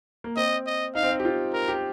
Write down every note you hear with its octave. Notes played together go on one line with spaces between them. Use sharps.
A#3
C4 D#5
D#5
D#4 F5
C4
D#4
G4
F4
A#4
G4